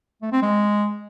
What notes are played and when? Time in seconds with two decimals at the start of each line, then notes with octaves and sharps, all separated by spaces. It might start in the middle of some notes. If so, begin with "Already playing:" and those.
0.22 A3
0.32 C4
0.42 G#3